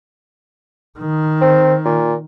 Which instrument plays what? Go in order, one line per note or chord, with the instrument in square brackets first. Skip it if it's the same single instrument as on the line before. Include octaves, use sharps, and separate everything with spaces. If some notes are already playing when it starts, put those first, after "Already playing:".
[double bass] D#3
[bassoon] C4
A#2